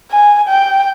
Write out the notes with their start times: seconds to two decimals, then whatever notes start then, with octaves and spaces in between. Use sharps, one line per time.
0.11 G#5
0.48 G5